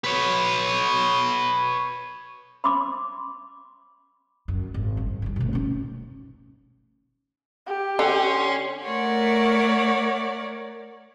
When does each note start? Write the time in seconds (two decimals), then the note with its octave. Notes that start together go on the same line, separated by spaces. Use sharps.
0.04 B4 C#5
2.64 B5 C6 D6
4.48 F#2
4.74 G#1
4.97 G2
5.22 G2 D#3
5.36 D2 B2
5.53 C#4 D#4
7.67 G4
7.99 D3 C#4 C6
8.82 A3 A#4 C#5 D5 F#5